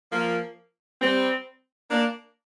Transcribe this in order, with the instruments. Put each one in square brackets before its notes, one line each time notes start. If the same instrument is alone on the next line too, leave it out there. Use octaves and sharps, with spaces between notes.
[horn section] F3 A#3
G3 C4
A#3 D4